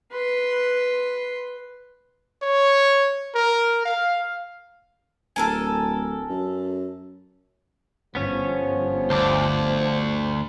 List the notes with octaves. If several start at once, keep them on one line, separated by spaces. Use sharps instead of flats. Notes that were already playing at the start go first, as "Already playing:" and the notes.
B4 C6
C#5
A#4
F5
D1 A4 A#4 G#5
F#2
G1 F3 B3 C#4 C#5
D2 C5 A5 D6